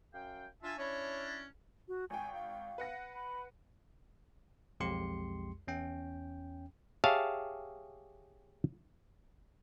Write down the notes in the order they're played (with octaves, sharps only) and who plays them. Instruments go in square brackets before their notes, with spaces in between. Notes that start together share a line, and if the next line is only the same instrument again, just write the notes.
[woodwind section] F#2 F5 G5
[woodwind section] D4 F4 [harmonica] E5 G#5 A5
[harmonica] C#4 D4 E4 [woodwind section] C#5
[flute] F#4
[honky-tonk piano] G#1 G5 [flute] G#5
[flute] F5
[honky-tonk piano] B4 F#5 A#6
[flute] B5
[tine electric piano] B1 F2 G#3 G4 C6 C#7
E2 C#4 G5
[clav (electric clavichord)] G4 G#4 C#5 E5 F5 A5